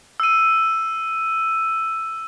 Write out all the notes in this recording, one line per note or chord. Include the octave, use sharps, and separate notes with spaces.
E6 D#7